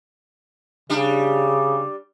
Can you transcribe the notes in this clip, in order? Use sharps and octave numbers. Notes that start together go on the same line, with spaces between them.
C#3 G3 D4